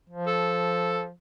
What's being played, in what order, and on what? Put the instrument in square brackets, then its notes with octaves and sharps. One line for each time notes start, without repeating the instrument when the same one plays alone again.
[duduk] F3
[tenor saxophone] A4